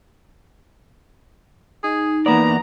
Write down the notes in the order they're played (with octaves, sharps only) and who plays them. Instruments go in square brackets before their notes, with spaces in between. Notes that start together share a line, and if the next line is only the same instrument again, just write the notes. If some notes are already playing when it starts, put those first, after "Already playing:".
[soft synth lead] D#4 [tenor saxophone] G#4
[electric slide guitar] E2 A#3 D5 [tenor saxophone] B3 [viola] A#5